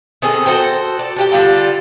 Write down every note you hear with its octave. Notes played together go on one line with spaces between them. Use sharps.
D#3 C4 G#4 A4
F#4 A4 C5 G5
A4 D5
D4 G4 G5
D3 G3 F4 A4